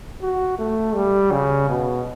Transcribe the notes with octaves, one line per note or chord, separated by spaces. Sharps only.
F#4
A3
G3
C#3
B2